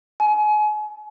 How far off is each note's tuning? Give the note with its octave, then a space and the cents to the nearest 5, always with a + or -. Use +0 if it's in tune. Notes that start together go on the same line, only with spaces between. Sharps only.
G#5 +35